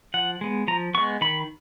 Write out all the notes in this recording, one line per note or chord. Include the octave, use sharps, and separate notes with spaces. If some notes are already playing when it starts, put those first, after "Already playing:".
F3 F#5
G#3 B3
F3 A#5
G#3 B3 C#6
D#3 B5